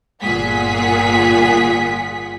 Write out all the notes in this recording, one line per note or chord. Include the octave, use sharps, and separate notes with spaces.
G1 A#2 F4 G#4 F#5 B6